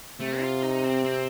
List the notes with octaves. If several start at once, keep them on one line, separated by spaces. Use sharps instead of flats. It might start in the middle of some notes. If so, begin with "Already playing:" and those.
C3 A3
F4
D#4
C4
C4